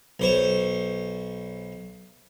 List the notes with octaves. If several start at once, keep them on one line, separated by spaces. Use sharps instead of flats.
B1 C5 C#5